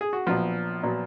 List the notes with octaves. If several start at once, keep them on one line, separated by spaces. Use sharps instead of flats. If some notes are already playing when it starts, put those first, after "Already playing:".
G#4
F#4
A#1 A#2 F3 F#3 B3 F4
A#2 F#3 B3